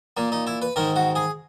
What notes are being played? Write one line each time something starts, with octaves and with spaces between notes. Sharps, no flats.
A#2 A#3
D#4
E4
B4
G#2 D#3 A#4
F#4
G#4